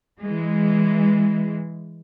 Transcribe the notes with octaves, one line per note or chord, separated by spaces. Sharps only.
E3 G#3